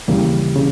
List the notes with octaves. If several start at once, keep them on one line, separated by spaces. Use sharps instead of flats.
D#2 C#3 E3 G3 A#3
C#3